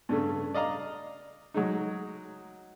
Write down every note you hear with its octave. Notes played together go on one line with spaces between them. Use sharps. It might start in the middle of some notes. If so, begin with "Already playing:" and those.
G2 C#3 A3
D5 D#5 F5 A#5
F#3 G#3 D#4